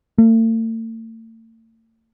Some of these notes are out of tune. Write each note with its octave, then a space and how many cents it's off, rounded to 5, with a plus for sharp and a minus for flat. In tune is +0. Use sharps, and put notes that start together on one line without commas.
A3 +45